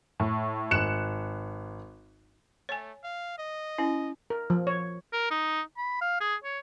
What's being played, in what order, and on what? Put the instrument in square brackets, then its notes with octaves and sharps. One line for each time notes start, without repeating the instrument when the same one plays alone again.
[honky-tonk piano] A2
G#1 F#6 C#7 E7
[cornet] A3 [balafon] C#5 G#5
[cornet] F5
D#5
[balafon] C#4 E4
[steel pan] A#4
F3
C#5
[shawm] A#4
D#4
B5
F5
G#4
C#5